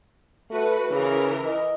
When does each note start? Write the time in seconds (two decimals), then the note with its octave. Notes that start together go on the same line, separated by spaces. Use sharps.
0.51 A3 F#4 B4
0.91 C#3 E3 A#4
1.45 D#5